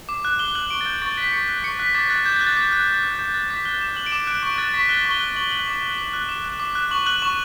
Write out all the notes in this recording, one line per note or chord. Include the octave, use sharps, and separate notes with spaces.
D6
F#6
D6 G7
F#6 F#7
C#6 D7
A6
F#6 G6
C#6 A6
F#6 B6
C#6 C#7
F#6
C#6 C#7
F#6 B6
D6 A6
F#6 A6
D6 G6
A6
F#6
A6
D6 A6
F#6
D6
F#6
D6 G6
F#6 A6
D6 B6
F#6 G7
D6 E7
F#6 F#7
D7
D6 E7
F#6 D7
C#6 D7
F#6 A6
C#6 B6
F#6 G7
C#6
G7
F#6
C#6 F#7
F#6 F#7
D6
F#6
D6
F#6
D6 E7
F#6
D6
F#6
C#6 F#7
F#6 F#7
C#6 E7